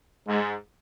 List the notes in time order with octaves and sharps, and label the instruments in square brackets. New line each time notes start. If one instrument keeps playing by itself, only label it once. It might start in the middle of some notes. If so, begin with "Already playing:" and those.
[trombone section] G#2 [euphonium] G#3